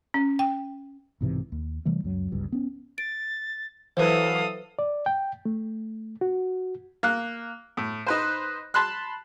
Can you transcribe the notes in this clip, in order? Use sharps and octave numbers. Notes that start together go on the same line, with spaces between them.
C#4
G5
B1 G#2 C3 E3
D#2
C3 E3 G3 A3
C#2 F#2 F#3
G1 C#2 G2
B3 C#4
A6 D7
E3 F#3 E4 A4 B4 C5 F5 D#6
D5
G5
A3
F#4
A#3 F#6
A2
D#4 B4 C5
A5 B5 C6 F#6